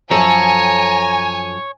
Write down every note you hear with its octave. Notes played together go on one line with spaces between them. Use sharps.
F#2 F3 A4 C#5 G#5 A#5